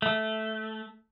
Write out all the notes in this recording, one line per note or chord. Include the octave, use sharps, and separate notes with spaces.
A3